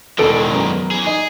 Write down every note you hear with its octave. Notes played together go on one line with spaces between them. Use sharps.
E1 D#3 E3 G#3 A4 D7
F#2 B3
E3 G#4
D#4 G#4